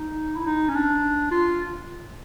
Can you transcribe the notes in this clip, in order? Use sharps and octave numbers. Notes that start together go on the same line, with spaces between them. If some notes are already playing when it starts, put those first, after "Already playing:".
Already playing: D#4
E4
D#4
C#4
D4
F4